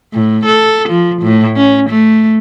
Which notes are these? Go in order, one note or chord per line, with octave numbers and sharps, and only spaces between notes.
A2
A4
F3
A2
C#4
A3